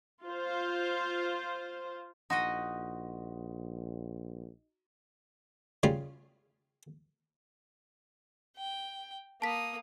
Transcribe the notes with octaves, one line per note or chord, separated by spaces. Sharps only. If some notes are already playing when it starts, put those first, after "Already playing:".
F4 C5
A#1 D#4 F#4 D#5 F#5 C6 D#6
C#3 G3 F4
G5
A#3 A5 D#6 B6